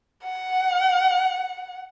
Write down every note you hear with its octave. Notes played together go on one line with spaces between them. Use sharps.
F#5